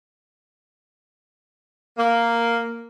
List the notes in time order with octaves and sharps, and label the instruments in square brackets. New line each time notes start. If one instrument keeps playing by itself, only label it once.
[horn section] A#3